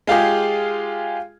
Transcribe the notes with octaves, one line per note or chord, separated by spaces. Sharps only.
G#3 F4 G4 G#4